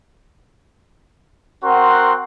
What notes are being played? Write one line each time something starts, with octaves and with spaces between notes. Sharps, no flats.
C4 F#4 A#4 F#5 C6